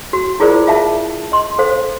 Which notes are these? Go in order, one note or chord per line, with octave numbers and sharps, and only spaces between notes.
F#4
E4 F4 G#4 A#4 C5 D5
F4 G#4 E5 F5 A5
D#5 C6
A4 C5 F5